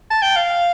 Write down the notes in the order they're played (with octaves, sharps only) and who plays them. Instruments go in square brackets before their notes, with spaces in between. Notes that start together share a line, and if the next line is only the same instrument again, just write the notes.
[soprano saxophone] A5
G5
F5